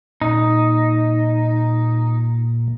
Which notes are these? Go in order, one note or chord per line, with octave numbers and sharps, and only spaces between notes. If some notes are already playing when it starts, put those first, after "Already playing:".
A#2 D#4